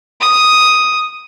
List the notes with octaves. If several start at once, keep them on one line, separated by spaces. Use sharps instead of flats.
D#6